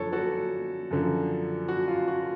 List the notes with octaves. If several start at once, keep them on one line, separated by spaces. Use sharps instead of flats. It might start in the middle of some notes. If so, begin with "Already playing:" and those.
Already playing: F#2 D3 F3 A4 C#5
F#4 A4
F#2 D3 F3
F#4
F4
F#4